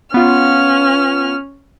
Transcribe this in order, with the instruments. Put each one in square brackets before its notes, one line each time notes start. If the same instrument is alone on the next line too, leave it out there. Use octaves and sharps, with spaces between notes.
[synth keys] B3 F4 [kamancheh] C#4 F6